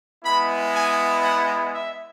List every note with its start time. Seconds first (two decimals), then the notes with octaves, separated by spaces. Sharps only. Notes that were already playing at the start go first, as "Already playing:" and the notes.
0.24 G#3 B3 E4 B5
0.75 G#5
1.24 F#5
1.75 E5